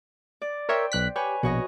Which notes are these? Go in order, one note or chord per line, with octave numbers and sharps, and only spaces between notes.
D5
A#4 C5 C#5 E5 G5 G6
B1 F#6 B6
G4 B4 C#5 G#5
A#1 B2 F#4 C#5 D#5